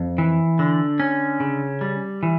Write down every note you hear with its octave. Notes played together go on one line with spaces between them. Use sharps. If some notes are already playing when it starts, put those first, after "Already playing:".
Already playing: F2
E3
D3
C#4
C#3
G3
E3